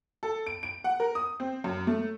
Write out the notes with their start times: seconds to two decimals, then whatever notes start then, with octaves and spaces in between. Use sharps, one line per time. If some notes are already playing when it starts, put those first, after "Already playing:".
0.23 A4
0.46 D7
0.63 D7
0.84 F#5
1.00 A#4
1.15 D#6
1.40 C4
1.64 F#2
1.87 A3